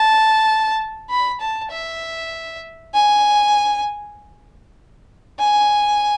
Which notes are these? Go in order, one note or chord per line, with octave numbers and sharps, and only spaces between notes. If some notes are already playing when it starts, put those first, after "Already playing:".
Already playing: A5
B5
A5
E5
G#5
G#5